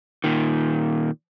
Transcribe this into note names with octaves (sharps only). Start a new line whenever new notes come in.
A#2 D#3